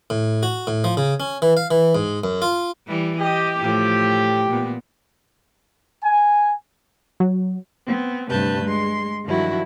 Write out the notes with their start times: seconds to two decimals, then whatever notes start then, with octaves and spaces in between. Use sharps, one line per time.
0.10 A2
0.43 F#4
0.67 A2
0.84 F3
0.97 C#3
1.20 C#4
1.42 E3
1.57 F5
1.71 E3
1.95 G#2
2.24 F#2
2.42 F4
2.87 E3 G3
3.19 G4 D#5
3.59 A2 F3
4.50 A#2 B3
6.02 G#5
7.20 F#3
7.86 B3 C4
8.30 D2 G2 C3 B4 A5 G6
8.65 G#3 C6
9.25 G2 D#3 F3 F#3 E4 F#4